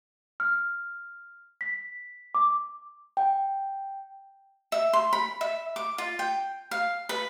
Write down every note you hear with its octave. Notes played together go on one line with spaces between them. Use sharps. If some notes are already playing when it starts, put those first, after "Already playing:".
F6
B6
D6
G5
E5
C6
B5
E5
D6
F4
G5
F5
B4